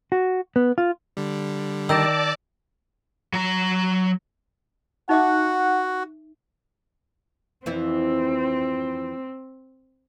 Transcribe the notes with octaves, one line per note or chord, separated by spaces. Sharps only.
F#4
B3
F4
D3 G3
D#3 D5 A5 D6 E6 G6 A#6
F#3 A#5
D#4 F#4 E5 F#5 D6
F2 E3 C4 E4